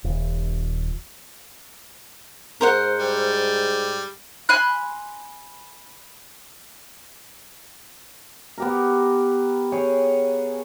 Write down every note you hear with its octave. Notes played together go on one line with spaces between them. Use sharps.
D#1
G#2 A#4 C5 F#5
G3
G#5 B5 C6 F#6
B3 G4 A#4
G#4 C#5 G5